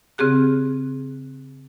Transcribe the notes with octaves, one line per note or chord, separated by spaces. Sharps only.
C#3 C4 G4 G#4 F#6